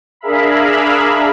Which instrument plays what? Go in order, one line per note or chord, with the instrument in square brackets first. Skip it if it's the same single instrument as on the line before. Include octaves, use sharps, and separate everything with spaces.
[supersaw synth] D4 G#4 A#4 E5 F5 B5